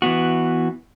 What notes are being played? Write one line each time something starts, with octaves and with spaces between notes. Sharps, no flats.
E3 B3 F#4